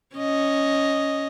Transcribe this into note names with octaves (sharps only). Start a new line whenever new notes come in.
C#4 D#5